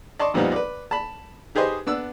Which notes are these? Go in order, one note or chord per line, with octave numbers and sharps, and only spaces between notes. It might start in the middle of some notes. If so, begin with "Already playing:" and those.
D5 D#5 A5 C6 C#6
F2 A#2 F3 G3 B3 D#4
B4 D5
A5 B5
D#4 G4 G#4 B4 C5 D#5
B3 D4 E6